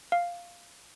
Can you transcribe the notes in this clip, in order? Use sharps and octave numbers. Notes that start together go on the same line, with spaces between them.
F5